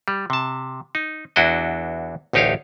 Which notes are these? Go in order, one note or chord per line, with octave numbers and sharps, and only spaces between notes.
G3
C3 A5
D#4
E2 D4 E4 F#4 D#5
A1 D2 D#4 G4 C#5 F5